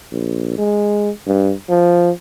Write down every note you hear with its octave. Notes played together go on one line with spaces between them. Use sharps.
A#1
G#3
G2
F3